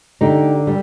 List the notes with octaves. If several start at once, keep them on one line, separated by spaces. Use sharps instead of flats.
D3 D#4 G4
G3